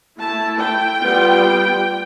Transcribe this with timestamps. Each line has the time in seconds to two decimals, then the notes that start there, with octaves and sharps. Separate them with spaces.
0.19 A3 E4 A5
0.59 G5
0.99 G3 B3 F4